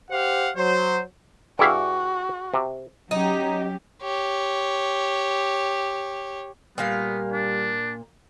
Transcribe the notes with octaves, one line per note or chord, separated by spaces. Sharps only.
G4 C5 F5 F#5
F#3 C5
G2 E4 F#4 G#4 F5 G5 G#5
C3
F#3 C#4 D#4 G4
G4 C#5
A#2 G3 A#3 B3 F5
D4